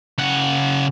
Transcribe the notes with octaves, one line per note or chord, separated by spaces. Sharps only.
C#3 F#5